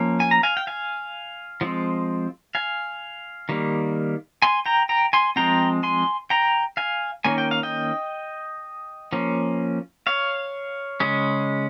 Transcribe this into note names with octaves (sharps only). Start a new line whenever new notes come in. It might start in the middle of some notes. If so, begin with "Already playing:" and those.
Already playing: F3 A#3 C#4
G#5
A#5
F5 G#5
G5
F5 G#5
F3 G#3 C4
F5 G#5
D#3 G3 A#3
G#5 C6
G5 A#5
G5 A#5
G#5 C6
F3 G#3 C4 G5 A#5
G#5 C6
G5 A#5
F5 G#5
D#3 G3 A#3 C#4 G#5
G5
F5
D#5 G5
F3 A#3 C#4
C#5 F5
C#3 G#3 C#4